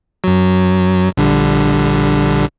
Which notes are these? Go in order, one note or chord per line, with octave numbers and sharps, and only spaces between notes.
F#2 F#3
A#1 D3 G3